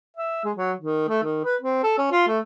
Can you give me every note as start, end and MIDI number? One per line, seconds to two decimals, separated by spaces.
0.17 0.40 76
0.44 0.52 56
0.57 0.73 54
0.79 1.07 51
1.08 1.20 57
1.23 1.40 51
1.45 1.56 71
1.61 1.80 60
1.83 1.94 69
1.98 2.09 61
2.12 2.25 65
2.28 2.39 57